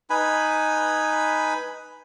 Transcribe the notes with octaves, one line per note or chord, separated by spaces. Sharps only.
D#4 B4 G#5 B5